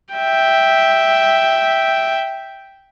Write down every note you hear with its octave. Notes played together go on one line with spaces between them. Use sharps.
E5 G5